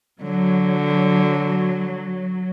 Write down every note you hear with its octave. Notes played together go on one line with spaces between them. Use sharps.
D3 F#3